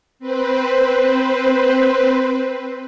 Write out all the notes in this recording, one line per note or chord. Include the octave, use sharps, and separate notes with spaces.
C4 B4 C5